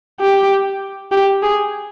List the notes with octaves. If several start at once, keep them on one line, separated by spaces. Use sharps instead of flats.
G4
G4
G#4